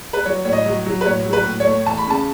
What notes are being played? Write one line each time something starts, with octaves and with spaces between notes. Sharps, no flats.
B4
F#3 C#5
A2 C#5
D#5
F#3
F#3
B4
A2 C#5
F#3
B4
A2
C#5
A3
E2 A5
B5
C#3 A5